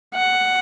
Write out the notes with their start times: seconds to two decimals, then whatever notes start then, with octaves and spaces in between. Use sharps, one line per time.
0.15 F#5